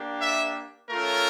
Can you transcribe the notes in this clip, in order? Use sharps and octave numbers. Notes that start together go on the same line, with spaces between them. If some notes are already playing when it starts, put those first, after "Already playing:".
Already playing: A#3 D4 G4
E5
A3 C#4 F4 A#4